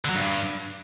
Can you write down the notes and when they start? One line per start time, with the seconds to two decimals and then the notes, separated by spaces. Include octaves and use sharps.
0.05 D3
0.10 F#3
0.15 G2